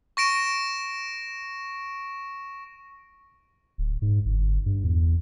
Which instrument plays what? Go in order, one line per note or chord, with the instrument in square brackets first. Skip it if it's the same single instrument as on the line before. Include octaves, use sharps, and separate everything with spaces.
[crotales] C#6 A#6 D7 E7
[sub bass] D1
G#2
G1
G2
E2